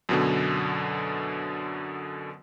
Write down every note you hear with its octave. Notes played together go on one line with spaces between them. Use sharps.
F#2 B2 D3